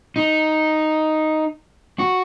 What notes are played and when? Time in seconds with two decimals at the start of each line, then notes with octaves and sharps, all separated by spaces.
0.16 D#4
1.99 F#4